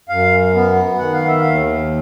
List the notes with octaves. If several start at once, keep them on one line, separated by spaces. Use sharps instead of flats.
F#2 F5
B3
D#3 F#5
F5
E5
D#2 F5